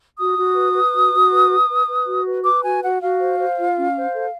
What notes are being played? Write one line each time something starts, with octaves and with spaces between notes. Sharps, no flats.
F#4 D#6
F#4
B4
B4
F#4
F#4
B4
B4
B4
B4
F#4
B4
B4 D6
F#4 G#5
F#4 F#5
F#4 F5
C5
C5
F4
C#4
C5
A4